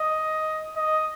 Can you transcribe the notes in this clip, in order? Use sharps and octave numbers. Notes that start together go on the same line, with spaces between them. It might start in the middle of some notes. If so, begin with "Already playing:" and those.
Already playing: D#5
D#5